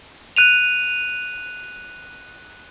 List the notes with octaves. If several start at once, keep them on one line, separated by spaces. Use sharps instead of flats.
F#6 D#7 F7